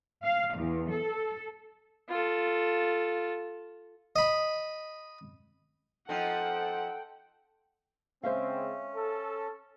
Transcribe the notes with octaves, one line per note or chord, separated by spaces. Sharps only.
F5
E2
A4
F4 A4
D#5 B5
F3 C4 D#4 A4 F#5 G5
C#3 G#3 C4 C#4 C5 E5 F5
A4